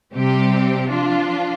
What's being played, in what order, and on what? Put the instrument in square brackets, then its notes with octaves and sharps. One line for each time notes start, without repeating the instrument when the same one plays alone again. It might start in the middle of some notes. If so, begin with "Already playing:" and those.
[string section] C3 G3 C4 G4
F3 D4 F4